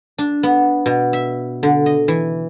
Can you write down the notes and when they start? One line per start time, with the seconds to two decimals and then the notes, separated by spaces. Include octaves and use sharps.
0.18 D4
0.43 B3
0.86 B2
1.13 E5
1.63 D3
1.86 D#5
2.08 E3